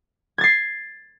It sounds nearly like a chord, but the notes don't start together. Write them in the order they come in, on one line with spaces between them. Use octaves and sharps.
G#6 A6 C7